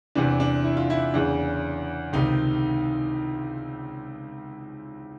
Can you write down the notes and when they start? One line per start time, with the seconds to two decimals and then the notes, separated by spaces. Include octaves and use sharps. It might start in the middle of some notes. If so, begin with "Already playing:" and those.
0.15 E2 C3 E3 D4
0.40 D4
0.64 E4
0.77 F4
0.90 E4
1.14 E2 C#3 E3 D4
2.13 C#2 C3 D#3 D#4